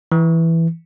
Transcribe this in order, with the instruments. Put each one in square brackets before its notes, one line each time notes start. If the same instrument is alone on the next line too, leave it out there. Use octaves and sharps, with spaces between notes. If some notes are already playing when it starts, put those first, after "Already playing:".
[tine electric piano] E3